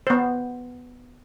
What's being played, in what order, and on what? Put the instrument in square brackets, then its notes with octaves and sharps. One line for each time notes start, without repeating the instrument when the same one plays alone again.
[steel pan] B3 C5